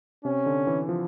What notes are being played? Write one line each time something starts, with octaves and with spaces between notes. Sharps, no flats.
C3 C#4
D3
E3
F3